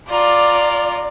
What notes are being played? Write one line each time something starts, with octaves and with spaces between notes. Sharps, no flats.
F4 D5 A#5